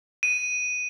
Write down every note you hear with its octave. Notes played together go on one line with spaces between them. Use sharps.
D#7